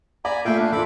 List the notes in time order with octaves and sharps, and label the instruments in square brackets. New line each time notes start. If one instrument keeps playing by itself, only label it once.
[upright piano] D5 [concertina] G#5 A#5 B5
[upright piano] A#2 A3 [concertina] E5 F5 G5
[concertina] D4
[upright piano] D#2 A#2 [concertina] A4 B5 D6